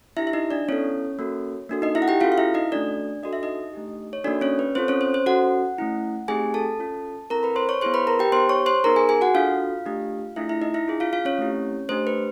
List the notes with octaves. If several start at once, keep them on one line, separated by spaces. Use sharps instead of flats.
D4 E4 G4 E5
E5
D#4 D#5
D4 D5
B3 C#4 E4 A4 C#5
A#3 C#4 F#4 A4
A#3 D4 F#4 A4
D#4 D#5
E4 E5
F#5
G4 G5
C#4 F4 F#4 A4 F5
F5
E4 E5
D#4 D#5
A3 C#4 D4 F#4 A4 D5
D4 F#4 A4 D#5
E5
D#4 D#5
A3 D4 G4
C#5
A#3 D4 D#4 F#4 A4 D5
C#4 C#5
B4
C4 F4 A4 C5
C#4 C#5
C5
C5
C#4 F#4 A4 F#5
A3 C#4 E4
A3 C4 D#4 G4 G#4 G#5
A4 A5
C#4 F4 A4
C4 E4 A4 A#4 A#5
B4 B5
C5 C6
C#5 C#6
B3 E4 G#4 C5 C6
B4 B5
A#4 A#5
G4 G5
B3 D#4 G4 C5 C6
C#5 C#6
C5 C6
B3 D#4 G#4 A#4 A#5
G#4 G#5
G#4 G#5
F#4 F#5
D4 F4 F#4 A4 F5
A3 D4 G4
A3 D4 E4 F4 G#4 E5
E4 E5
D#4 D#5
E4 E5
D4 F4 G#4
F4 F5
F4 F5
C#4 C#5
A3 C4 E4 G4
A3 D4 G4 C5
B4